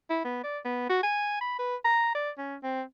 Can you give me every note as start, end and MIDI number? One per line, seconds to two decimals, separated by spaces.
0.10 0.20 64
0.25 0.42 59
0.44 0.59 74
0.65 0.86 59
0.90 0.99 66
1.03 1.36 80
1.41 1.59 83
1.59 1.76 71
1.85 2.10 82
2.15 2.30 74
2.38 2.56 61
2.63 2.82 60